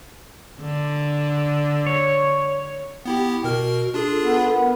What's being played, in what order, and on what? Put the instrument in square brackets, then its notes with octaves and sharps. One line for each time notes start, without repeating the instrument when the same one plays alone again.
[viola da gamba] D3
[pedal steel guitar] C#5
[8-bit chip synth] B3 E4 G4 [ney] G5
[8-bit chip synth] B2 A#4 F6 [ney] F#4
[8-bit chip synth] D4 F4 G#4 [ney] A4
[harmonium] B3
[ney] A#4